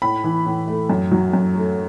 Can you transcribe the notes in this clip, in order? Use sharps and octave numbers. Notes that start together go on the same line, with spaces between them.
A2 B5
E3
A2
A3
F#2
F#3
F#2
A3